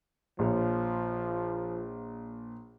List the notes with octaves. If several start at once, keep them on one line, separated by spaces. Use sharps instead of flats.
A#1 F3 C#5